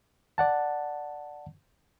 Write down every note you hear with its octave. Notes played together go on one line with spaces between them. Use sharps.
D5 F#5 A5